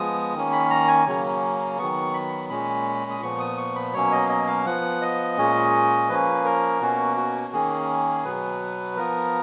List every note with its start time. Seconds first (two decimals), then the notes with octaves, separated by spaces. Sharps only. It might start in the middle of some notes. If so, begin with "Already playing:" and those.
Already playing: F3 G#3 B3 D#6
0.34 D#3 A#3 C#4
0.53 B5
0.70 A#5
0.88 G#5
1.07 C#3 F#3 A#3 C#4
1.78 D#3 F#3 B3 C#6
2.14 B5
2.50 A#2 G#3 C#4 B5
3.11 D#6
3.22 A#2 F3 B3 C#6
3.40 D#6
3.57 C#6
3.76 B5
3.93 B2 F#3 A#3 C#4 C#5
4.12 D#5
4.29 D#5
4.47 F5
4.65 F3 B3 F#5
5.02 D#5
5.37 A#2 G#3 C#4
6.09 F3 A#3 C#4 B4
6.45 A#4
6.81 B2 A#3 C#4 F#4
7.17 F#4
7.53 D#3 A#3 C#4 G#4
8.25 B2 F#3 B3 B4
8.96 F3 B3 A#4